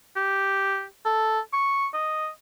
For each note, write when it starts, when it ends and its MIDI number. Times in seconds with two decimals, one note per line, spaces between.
0.16 0.84 67
1.05 1.39 69
1.53 1.87 85
1.93 2.28 75